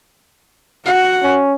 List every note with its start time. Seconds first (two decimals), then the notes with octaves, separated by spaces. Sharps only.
0.85 F#4 F#5
1.23 C#4